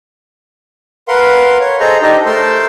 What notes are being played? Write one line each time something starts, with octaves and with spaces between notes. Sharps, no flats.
A#4 B4 F5 F#5 C6
C#5
G#4 A4 C5 D#5 A#5
D4 D#4 G4 A4 D#5
A3 A#4 C5 A5 C6 E6